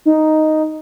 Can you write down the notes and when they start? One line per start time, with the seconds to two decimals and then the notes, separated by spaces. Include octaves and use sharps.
0.06 D#4